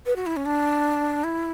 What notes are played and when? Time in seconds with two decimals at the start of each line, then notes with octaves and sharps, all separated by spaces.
0.06 B4
0.16 F#4
0.26 E4
0.37 C#4
0.46 D4
1.24 E4